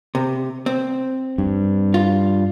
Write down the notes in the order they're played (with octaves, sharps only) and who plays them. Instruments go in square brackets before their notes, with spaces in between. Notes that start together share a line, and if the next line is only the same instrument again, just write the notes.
[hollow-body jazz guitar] C3
C4
[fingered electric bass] G2
[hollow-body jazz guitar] F4